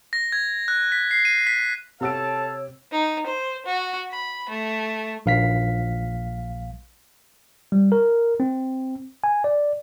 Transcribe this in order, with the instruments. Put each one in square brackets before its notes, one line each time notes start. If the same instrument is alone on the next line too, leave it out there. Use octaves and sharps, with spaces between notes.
[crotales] A#6
G#6
F#6
B6
C7
D#7
B6
[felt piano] C3 E6 D7 [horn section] A4 F5 A5 [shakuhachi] C#5
[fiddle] D#4
C5
F#4
B5
A3
[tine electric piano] A#1 F5 B6
G3
A#4
C4
G#5
D5